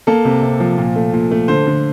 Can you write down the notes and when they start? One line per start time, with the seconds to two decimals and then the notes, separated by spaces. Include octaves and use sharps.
0.07 A#3 A4
0.25 C3
0.42 C3
0.60 F3
0.78 A#2
0.96 A3
1.13 A#2
1.31 A3
1.48 D3 C5
1.67 D3